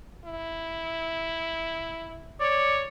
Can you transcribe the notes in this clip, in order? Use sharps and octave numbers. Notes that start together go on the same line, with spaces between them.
E4
C#5 D5